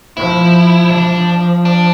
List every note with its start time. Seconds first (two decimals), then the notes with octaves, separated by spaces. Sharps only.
0.17 F3 E4
0.91 F3 D4
1.65 D4